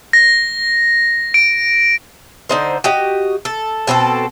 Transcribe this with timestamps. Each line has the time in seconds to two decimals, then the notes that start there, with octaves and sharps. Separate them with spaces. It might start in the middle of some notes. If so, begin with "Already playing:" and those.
0.13 A#6
1.34 D7
2.49 D3 D#4 C5
2.84 F#4 G4 D#5
3.45 A4
3.87 B2 C4 F#4 A4